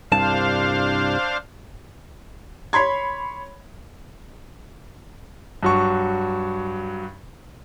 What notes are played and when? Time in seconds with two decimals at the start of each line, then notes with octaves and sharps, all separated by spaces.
0.12 C2 G2 D4 C5 F5 A5
2.73 C#5 B5 C6 G#6
5.63 G2 F#3 C#6